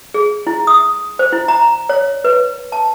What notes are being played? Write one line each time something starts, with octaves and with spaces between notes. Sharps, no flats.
G#4
E4
D#6
C5
E4
A#5
C#5
B4
A5